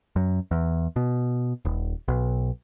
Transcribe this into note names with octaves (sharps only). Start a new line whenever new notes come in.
F#2
E2
B2
D#1
B1